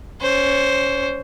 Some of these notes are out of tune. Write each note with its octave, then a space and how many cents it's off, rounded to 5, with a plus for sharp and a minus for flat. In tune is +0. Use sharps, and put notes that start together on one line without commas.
C#4 +15 C5 +0